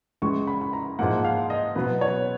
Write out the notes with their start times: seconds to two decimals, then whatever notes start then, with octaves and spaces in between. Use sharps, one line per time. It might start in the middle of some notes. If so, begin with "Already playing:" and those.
0.22 C#2 C#3 G#3 C#6
0.47 B5
0.61 B5
0.73 A#5
0.99 G#2 F3 A#3 F#5
1.25 F5
1.50 D#5
1.75 B2 F#3 B3 B4
2.01 C#5